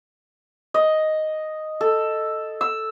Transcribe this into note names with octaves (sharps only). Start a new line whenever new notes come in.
D#5
A4
E6